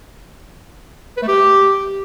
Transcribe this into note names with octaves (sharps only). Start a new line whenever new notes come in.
B4
A3
G4